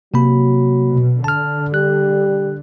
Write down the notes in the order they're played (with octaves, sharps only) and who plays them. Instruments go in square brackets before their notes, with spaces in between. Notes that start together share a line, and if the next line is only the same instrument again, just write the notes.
[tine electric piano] C3 A#3 B5 [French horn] F#3
[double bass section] B2
[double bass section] D3 [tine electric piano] A5 F6
[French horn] G3 [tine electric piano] F#6